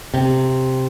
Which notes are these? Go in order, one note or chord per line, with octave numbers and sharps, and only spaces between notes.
C3